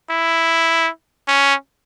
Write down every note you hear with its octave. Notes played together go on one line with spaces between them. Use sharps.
E4
C#4